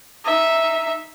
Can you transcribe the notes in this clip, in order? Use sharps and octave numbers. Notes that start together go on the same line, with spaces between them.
D#4 E5